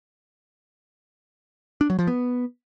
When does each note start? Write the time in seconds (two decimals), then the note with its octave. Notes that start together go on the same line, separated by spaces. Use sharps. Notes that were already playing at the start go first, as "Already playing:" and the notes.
1.81 D4
1.90 F#3
1.99 F3
2.07 B3